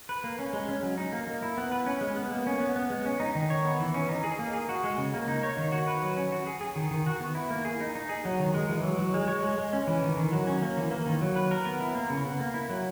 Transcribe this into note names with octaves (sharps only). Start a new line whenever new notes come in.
B4
A#3
C#4
G#3
C#4
F#3
D#4
A#3
A#3
E4
B3
B4
C#4
G#3
B3
A#3
C#4
B3
B3
G#3
C#4
D#4
D#3
C#5
B3
E3
C#4
D#4
G#4
A#3
G#4
F#4
G#3
C#3
A#3
D#4
C#5
D#3
F#4
B4
F#3
C#4
F#4
G#4
G#4
D#3
D#3
F#4
B3
E4
A#3
G#4
D#4
D#4
G#4
F#3
D#3
G#3
E3
F#3
F#3
G#3
C#5
G#3
G#3
C#4
E3
D#3
D#3
F#3
C#4
A#3
E3
A#3
D#3
F#3
B4
A#4
B3
E4
A#3
C#3
B3
A#3
E4
F#3